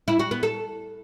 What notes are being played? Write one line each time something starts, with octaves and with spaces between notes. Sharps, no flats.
E4
F#4
B3
A4